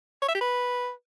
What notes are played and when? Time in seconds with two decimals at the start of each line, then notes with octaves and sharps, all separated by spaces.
0.22 C#5
0.28 E5
0.35 G4
0.41 B4